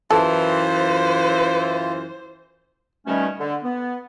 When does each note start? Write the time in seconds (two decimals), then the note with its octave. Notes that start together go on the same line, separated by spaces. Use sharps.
0.11 F#2 E3 F4 A4 C5
3.07 B2 D#3 G3 A3 C#4
3.39 D3
3.63 B3